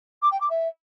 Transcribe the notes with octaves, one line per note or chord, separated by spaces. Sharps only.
D6
G5
D6
E5